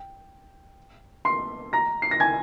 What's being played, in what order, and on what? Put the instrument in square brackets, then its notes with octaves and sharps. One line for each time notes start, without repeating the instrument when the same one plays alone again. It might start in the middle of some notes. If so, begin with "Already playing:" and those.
Already playing: [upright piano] G5
C6 C7
A#5 A#6
C7
A#6
G#5 G#6